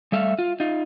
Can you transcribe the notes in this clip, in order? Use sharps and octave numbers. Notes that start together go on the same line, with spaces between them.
G3 A3 E5 F5
F4
D#4 F4